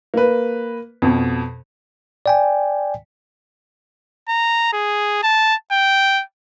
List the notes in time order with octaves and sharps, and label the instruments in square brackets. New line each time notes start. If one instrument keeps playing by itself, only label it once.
[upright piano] A#3 B4
F2 B2
[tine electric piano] D5 G5 G#5
[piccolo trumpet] A#5
G#4
A5
G5